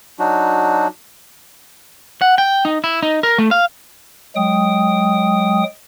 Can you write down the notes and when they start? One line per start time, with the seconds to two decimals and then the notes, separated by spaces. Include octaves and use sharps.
0.19 F#3 D4 D#4 F#4
2.21 F#5
2.38 G5
2.65 D#4
2.84 E4
3.03 D#4
3.23 A#4
3.38 A3
3.51 F5
4.36 F#3 G#3 G5 D#6